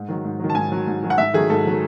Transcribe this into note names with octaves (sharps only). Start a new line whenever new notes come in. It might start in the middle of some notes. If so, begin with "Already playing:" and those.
Already playing: G#2
D#3 F#3
G#2
D#3 F#3
A5
G#2 G#5
D#3 F#3
G#2
D#3 F#3
F#5
G#2 E5
D#3 F#3 A3 G#4
G#2 A4
D#3 F#3 A3